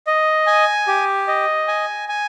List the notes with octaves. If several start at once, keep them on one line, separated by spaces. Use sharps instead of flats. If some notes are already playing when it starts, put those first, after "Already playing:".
D#5
G#5
G4
D#5
G#5
G#5